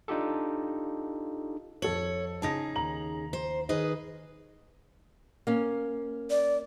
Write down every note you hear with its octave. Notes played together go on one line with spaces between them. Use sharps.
D4 D#4 F4 G4 A4
F2 A4 C#5 F#7
C#3 D#4 G#4 A5 A#6
D#2 A#5 F#7
C5
D#3 G#4 B4 D#5
A#3 C#4
D5